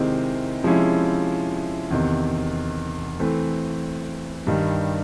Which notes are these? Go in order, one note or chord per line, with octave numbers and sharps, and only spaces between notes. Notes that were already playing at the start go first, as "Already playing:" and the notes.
Already playing: C3 D#3 G#3 C4 E4
C3 F3 G#3 C#4 E4
E2 C3 D#3
E3 A3 C4
G2 D#3 G3